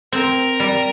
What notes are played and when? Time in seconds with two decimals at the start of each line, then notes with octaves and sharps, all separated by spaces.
0.12 C4 A#4
0.60 G3